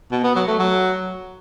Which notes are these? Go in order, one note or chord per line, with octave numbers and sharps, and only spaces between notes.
B2
B3
F#3
A3
F#3